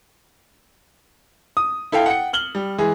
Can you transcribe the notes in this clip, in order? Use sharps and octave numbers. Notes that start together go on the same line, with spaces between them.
D#6
E4 A4 E5 F5 G5
F#5 G5 C#7
F6 F#7 G7
G3
E3 G#3 G#4